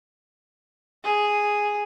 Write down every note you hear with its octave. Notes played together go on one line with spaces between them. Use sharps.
G#4